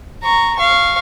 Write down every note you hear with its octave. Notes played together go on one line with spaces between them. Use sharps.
A#5 C#6
F5 C#6